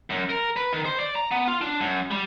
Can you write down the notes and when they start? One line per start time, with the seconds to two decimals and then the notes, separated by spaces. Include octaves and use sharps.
0.10 F#2
0.30 A#4
0.56 B4
0.73 D#3
0.85 C5
1.00 D5
1.15 A#5
1.31 B3
1.48 F4
1.61 D4
1.80 F#2
2.11 G3